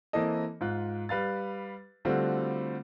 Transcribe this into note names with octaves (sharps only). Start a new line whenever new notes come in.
E3 A#3 C4 E4 A4 D#5
G#2 F4 F#6
G3 B4 F5 A6
D3 G3 A3 C4 F4 F#4